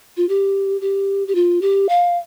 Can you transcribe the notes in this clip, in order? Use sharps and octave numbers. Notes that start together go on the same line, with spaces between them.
F4
G4
G4
G4
F4
G4
F5